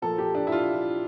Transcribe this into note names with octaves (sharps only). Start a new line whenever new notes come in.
A#2 F3 A#3 A4
G4
D4
E4
F4